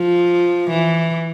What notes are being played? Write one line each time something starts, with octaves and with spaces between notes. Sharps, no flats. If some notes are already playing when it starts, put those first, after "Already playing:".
Already playing: F3
E3